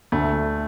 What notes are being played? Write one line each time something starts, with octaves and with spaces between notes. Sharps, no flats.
D2 A3